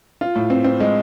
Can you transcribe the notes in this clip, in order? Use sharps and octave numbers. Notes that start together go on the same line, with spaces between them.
F4
A2
C4
C4
G#3